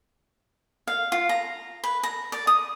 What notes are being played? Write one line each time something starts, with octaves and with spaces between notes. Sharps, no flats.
F5
F4
A#5
B4
A#5
D5
D#6